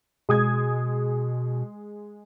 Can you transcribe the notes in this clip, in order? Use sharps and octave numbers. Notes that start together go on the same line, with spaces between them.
B2 G#3 D#6 G#6